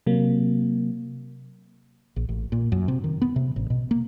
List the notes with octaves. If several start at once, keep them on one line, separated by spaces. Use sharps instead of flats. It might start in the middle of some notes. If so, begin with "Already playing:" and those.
C3 F#3 A#3
A#1
A1
A#2
F#2
C3
D#3
B3
C3
A1
B2
A#3